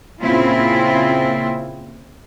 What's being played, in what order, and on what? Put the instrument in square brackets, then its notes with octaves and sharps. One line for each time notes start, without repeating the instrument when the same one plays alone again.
[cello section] A#2 C#3 A#3 C4 E4 F4